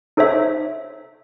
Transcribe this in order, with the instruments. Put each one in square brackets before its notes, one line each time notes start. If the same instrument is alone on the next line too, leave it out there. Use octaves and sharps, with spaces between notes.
[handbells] D#4 A4 C5 C#5 E5